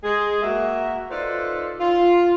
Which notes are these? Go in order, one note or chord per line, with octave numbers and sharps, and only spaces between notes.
G#3 G#4
A#3 F#4 A#4 E5
D#4 F4 A4 B4 C5 D5
F4